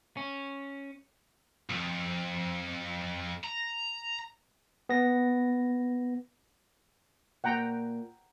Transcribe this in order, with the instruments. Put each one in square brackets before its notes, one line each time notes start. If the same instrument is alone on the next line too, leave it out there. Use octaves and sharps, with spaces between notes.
[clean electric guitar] C#4
[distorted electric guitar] B1 F2
A#5
[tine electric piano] B3 A#6
[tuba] A#2 [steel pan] F#5 G5 A#5